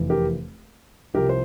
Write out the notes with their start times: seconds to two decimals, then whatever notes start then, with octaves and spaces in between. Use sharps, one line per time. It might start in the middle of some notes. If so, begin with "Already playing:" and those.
Already playing: F1 E2 E3
0.10 G4 A#4
1.14 C2 C3 F3 G4 A#4
1.29 C5